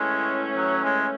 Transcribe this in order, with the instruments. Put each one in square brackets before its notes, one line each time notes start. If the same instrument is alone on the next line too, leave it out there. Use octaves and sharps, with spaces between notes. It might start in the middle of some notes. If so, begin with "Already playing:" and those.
Already playing: [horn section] A2 E3 A3 C#4 [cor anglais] G#3
[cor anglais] F#3
G#3